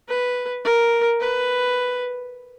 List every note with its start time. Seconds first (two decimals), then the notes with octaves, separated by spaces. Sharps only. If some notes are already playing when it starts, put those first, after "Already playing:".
0.09 B4
0.65 A#4
1.21 B4